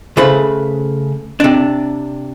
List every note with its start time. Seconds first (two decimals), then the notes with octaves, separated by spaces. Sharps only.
0.17 C#3 A3 B4 C5 B5
1.40 C3 D4